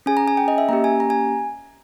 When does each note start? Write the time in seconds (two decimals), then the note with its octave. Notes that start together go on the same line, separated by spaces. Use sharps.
0.06 C#4 G#4 G#5
0.17 A#5
0.28 G#5
0.37 G5
0.48 D#5
0.58 E5
0.69 A#3 C#4 G4 A#5
0.84 G#5
1.00 A#5
1.10 G#5